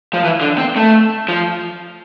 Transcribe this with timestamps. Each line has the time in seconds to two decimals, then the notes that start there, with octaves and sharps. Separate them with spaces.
0.14 F3
0.24 E3
0.41 D3
0.58 C4
0.76 A3
1.29 F3